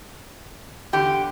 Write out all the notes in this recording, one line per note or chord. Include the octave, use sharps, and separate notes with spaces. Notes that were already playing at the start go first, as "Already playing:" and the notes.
E2 D3 G4